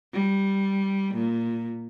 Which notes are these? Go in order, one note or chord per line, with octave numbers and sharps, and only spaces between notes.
G3
A#2